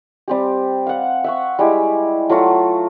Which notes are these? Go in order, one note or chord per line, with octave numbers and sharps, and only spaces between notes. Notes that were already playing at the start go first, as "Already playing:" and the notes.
G3 C4 G4
F5 F#5
E5 F#5 C#6
G3 G#3 E4
F#3 A3 F4 F#4